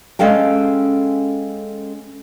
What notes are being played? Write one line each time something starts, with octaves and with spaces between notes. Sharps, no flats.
G#3 C#4 A4 F5 G5